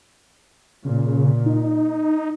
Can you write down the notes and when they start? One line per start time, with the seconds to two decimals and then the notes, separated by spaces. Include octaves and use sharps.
0.85 A#2 C#3
1.46 D#4